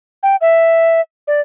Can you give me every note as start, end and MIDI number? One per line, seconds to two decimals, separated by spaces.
0.23 0.36 79
0.41 1.01 76
1.27 1.41 74